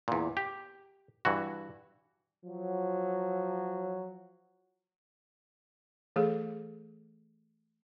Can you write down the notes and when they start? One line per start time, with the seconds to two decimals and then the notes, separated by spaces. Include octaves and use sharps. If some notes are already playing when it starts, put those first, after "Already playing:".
0.08 E2 A#2
0.37 G4
1.25 G2 E3 F#4
2.46 F3 F#3
6.16 E3 A3 G#4 A4